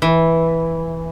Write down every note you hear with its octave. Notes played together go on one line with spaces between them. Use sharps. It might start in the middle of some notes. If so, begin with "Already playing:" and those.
E3